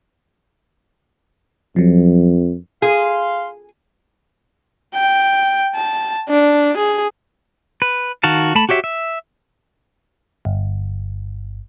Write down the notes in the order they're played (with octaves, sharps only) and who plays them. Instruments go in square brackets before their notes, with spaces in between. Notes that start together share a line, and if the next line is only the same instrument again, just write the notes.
[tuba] F2 [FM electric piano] F3 F#3
[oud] G#4 [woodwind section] F5 C6
[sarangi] G5
A5
D4
G#4
[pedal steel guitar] B4
D#3 F#4 F5 A5
A3 A5 B5
F#4 G4 C#5 E5
E5
[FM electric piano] G1